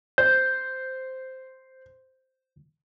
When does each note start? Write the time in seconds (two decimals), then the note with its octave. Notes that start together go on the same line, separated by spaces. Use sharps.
0.18 C5 G6